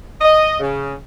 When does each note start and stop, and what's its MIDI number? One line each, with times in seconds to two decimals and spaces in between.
0.21 0.56 75
0.60 0.92 49